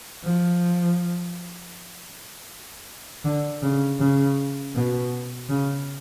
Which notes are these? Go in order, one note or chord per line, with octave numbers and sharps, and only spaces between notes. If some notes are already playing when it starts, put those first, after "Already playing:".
F3
D3
C#3
C#3
B2
C#3